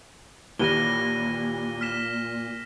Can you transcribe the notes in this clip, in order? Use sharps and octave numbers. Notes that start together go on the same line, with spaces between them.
D#2 A#2 E3 G3 A#6 D#7 G7
F6 B6 E7